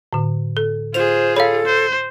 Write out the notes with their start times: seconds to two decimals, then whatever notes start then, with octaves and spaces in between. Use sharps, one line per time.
0.13 A2 D3
0.57 A4
0.94 F4 G#4 C5 F7
1.36 A4 C#5 F5 B5
1.66 C5